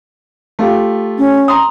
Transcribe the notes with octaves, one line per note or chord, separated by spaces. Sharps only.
A3 F4 G4
C#4
A#5 C6 D#6